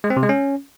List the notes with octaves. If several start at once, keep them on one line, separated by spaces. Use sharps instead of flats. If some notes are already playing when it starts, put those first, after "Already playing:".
G#3
C4
C3
G#3
C#4